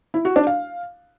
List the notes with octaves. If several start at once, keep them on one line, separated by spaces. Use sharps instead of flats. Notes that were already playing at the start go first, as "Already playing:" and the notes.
E4
F#4
D4
F5